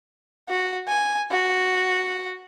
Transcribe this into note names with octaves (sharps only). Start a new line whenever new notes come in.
F#4
G#5
F#4